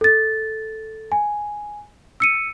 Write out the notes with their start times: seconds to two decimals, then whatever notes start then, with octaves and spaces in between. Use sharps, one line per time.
0.01 A4 A6
1.12 G#5
2.20 E6 C#7 D#7